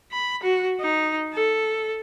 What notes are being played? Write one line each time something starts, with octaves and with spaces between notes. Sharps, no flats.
B5
F#4
D#4
A4